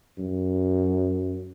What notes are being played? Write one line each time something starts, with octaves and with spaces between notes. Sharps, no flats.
F#2